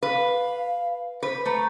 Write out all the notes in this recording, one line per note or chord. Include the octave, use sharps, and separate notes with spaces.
B4 F5
B4 C5
A3 A#5